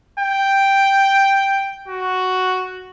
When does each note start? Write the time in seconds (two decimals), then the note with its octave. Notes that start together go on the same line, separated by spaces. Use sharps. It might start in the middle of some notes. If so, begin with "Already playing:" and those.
0.19 G5
1.88 F#4